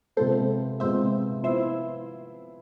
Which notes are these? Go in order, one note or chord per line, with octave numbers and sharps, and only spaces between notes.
C3 F3 G#3 B3 A4 C5
C3 F3 G#3 B3 C5 E5
F3 B3 E4 C5 E5